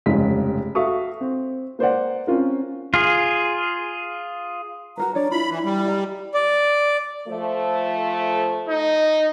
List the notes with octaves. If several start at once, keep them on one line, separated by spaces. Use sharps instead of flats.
F1 G2 C#3 G#3 B6
F#4 A4 E5 F5 C#6 D#6
C4
A#3 C5 D5 F#5
C4 C#4 F4 A#4
F4 G#4
F#4 A#4 B4 A#5
D4 C#5 D5
E4 F4 B5
E3
G3
G4 D#5 A#5
D5
F3 A3
D#4